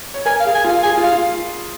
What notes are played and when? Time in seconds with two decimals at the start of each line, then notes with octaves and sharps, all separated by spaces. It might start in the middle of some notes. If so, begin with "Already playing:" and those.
0.14 C#5
0.26 A#4 G#5
0.40 F5
0.45 G#4
0.55 G#5
0.64 F4 F5
0.83 G#4 G#5
0.98 F4
1.03 F5
1.12 F4